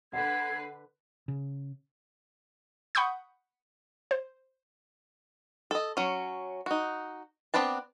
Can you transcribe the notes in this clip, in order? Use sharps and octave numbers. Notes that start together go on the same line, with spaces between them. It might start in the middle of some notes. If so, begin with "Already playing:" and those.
D3 B4 F#5 G#6 C7
C#3
F#5 B5 C#6 D#6 G6
C5
A4 D#5
F#3 C#4
D#4 F#4
B3 C4 D4 B4 A5